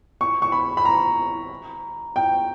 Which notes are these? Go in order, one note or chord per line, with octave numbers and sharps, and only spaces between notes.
C#6
C#6
B5
B5
A#5
G5